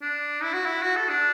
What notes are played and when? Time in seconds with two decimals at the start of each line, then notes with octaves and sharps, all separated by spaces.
0.02 D4
0.43 E4
0.54 F#4
0.66 E4
0.83 F#4
0.96 A4
1.10 D4